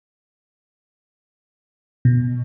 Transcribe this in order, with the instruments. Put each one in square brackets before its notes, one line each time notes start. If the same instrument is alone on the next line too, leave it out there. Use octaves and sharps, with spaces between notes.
[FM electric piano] B2